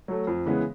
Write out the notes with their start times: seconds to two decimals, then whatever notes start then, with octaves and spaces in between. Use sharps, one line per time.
0.08 F#3 A3
0.27 F2
0.46 C#3 E3 G#3 B3